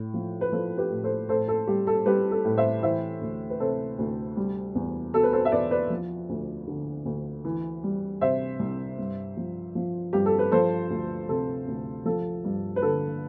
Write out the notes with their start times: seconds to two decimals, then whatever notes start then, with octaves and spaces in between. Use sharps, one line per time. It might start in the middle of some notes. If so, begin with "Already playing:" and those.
Already playing: A2
0.14 F3
0.41 B4
0.52 F3 A4 C5
0.77 G4 B4
0.91 A2
1.03 A4 C5
1.29 A2 A4 C5
1.48 A4
1.67 G3 G4
1.87 A4
2.06 G3 G4 B4
2.31 A4
2.45 A2
2.57 C5 E5
2.83 E3 C5 E5
3.21 D2
3.50 B4
3.59 C3 A4 C5
3.99 D2
4.37 G3
4.75 E2
5.13 B2 A4
5.23 B4
5.33 A4 C5
5.45 E5
5.52 E2 B4 D5
5.71 B4 D5
5.90 F3
6.29 D2
6.67 D3
7.05 D2
7.45 E3
7.83 G3
8.21 C3 C5 E5
8.59 C2
8.98 G2
9.37 F3
9.75 F3
10.13 G2 G4
10.26 A4
10.39 B4
10.51 F3 A4 C5
10.90 D2
11.29 C3 A4
11.68 D2
12.05 F3 A4
12.44 G2
12.76 B4
12.82 D3 A4